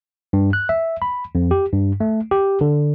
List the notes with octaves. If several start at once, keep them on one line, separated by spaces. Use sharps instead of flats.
G2
F#6
E5
B5
F2
G4
G2
A3
G4
D3